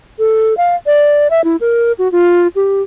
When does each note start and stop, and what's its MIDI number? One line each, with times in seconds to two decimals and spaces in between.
0.19 0.56 69
0.57 0.75 77
0.86 1.28 74
1.30 1.44 76
1.44 1.56 64
1.61 1.92 70
1.99 2.10 66
2.12 2.48 65
2.56 2.82 67